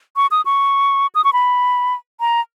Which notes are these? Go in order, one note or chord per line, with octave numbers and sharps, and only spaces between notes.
C#6
D#6
C#6
D#6
C#6
B5
A#5